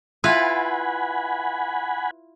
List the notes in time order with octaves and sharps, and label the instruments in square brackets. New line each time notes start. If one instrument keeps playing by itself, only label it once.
[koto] E4 F4 B4 [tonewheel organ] F#5 G#5 B5